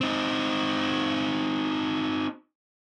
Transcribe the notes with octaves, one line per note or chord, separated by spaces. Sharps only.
C4 D#4